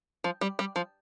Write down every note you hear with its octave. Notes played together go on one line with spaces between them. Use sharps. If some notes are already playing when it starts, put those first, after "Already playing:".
F3
G3
G3
F3